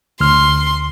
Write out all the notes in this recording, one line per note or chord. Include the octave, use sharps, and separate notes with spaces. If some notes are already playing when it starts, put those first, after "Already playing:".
D2 C6 F6